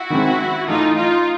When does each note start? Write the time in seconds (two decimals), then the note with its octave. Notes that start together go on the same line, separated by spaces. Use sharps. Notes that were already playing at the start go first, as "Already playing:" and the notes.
Already playing: E4 F#4
0.10 D#3 G#3 C4
0.68 A2 E3 A3 D#4 F4
0.95 D#4 F4